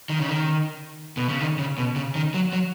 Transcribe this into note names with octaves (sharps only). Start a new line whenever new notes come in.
D#3
C#3
D#3
B2
C#3
D#3
C#3
B2
C#3
D#3
F#3
F#3